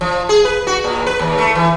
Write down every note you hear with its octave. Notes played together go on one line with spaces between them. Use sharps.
F3
G#4
B4
F#4
A#2
B4
D#2
A3
E3